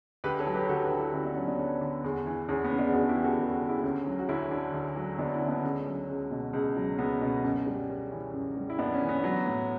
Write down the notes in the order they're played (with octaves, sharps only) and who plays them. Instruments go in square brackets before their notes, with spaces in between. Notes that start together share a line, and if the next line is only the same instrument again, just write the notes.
[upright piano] D2 G4 B4
A4 C#5
F#3
G4 B4
D2 F#4 A4
G4 B4
D3
E4 G4
D2 C#4 E4
B3 D4
F#3 C#4
B3 D4
D2
D3
E2
E3
E2 C#4
B3
C#3
B3 D4
E2 D4 F#4
E4 G4
E3
F#4 A4
E2 G4 B4
F#4 A4
C#3
E4 G4
B3
D2 C#4
F#3
F#4
D2 C#4 E4
D3
D2
F#3
D2 B3 D4
C#4 E4
D3
B3 D4
C#2 C#4
C#4
F#3
C#2
B2
C#2
F#3
C#2 B3
B2
F#2
G3
F#2 C#4
E3
F#2
G3
E4
F#2 B3 D4
C#4
E3
B3
F#3
A2